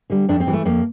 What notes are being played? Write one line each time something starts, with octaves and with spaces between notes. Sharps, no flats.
D3 G3
F2 D4
C4
E3 G3
A3
F2 A#3